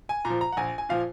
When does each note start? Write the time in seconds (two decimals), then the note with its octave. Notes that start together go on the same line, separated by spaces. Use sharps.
0.09 G#5
0.25 A#2 A#5
0.30 F3
0.41 A#5
0.52 F#5
0.57 A#1 G#5
0.78 G#5
0.89 A#2 F3 F5